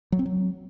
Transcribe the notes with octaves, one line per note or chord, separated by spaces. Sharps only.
F#3
C4
F#3